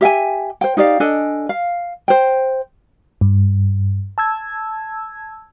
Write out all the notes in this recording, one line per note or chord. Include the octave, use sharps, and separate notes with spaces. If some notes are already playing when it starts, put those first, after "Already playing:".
G4 E5 G5 G#5
C5 G5
D#4 G4 D5 F5
D4 A4 D#5 G#5
F5
C5 G5
G2
A5 E6 G#6